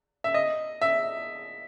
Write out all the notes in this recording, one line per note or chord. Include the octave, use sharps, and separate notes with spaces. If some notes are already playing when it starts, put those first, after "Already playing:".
E5
D#5
E5